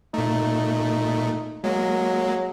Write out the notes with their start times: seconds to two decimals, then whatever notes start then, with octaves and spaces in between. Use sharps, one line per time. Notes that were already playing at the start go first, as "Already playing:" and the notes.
0.14 A#2 A3 D#4
1.64 F#3 G#3 A#3